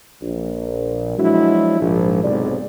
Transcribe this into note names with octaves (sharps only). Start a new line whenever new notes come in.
A#1
F3 F#3 G#3 D4 E4 F#4
A#1 G#2 F3
B1 G#2 C3 G#3 D5